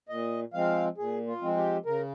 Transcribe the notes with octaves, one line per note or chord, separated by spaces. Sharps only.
A#2 D#5
F3 G#3 C4 F5
A#2 G#4
F4
F3 G#3 C4
G4
C#3 A#4